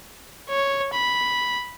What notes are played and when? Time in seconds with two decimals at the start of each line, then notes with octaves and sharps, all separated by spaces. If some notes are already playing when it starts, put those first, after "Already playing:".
0.50 C#5
0.93 B5